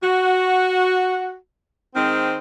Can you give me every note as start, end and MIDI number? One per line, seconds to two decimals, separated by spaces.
0.03 1.36 66
1.95 2.39 51
1.95 2.39 56
1.95 2.39 60